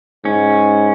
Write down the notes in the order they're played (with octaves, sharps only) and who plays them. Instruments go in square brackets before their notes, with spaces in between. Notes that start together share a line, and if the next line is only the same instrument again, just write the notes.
[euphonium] G#2 [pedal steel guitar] C#4